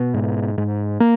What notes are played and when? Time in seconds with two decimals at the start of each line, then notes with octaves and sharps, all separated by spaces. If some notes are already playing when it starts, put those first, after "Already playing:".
Already playing: B2 B3
0.14 G#2
0.58 G#2
1.00 A#3